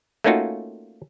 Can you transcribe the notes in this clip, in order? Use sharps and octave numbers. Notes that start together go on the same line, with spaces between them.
A3 A#3 C#4 D#4 F4 F#4